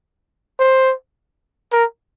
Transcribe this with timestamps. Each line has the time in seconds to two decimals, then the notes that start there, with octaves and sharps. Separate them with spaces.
0.59 C5
1.73 A#4